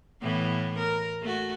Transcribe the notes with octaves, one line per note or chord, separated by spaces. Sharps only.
A2 E3 B3
A#4
A3 F#4